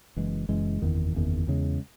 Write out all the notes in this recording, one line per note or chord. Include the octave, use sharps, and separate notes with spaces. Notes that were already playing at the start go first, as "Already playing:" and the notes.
F#1 F#2 E3 G#3
F#1 F#2 E3 G#3
F#1 E2 D#3
F#1 E2 D#3
E2 C#3 G#3